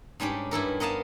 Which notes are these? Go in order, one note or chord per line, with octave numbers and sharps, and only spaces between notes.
G#2 G3 C#4 D4 G4
G2 E4 A4 A#4
B3 A#4 D#5 F5 A5